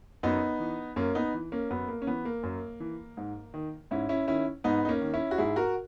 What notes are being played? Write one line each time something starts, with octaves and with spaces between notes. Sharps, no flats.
F#2 B3 D#4
E3
F#2 A#3 C#4
B3 D#4
E3
A#3 C#4
F#2 B3
A#3
C#4
E3 B3
A#3
F#2
E3
G#2
D#3
G#2 C#4 E4
C#4 E4
D#3 C#4 E4
G#2 B3 D#4
D#4
A#3 C#4
D#3
C#4 E4
F#4
G#2 E4 G#4
F#4 A#4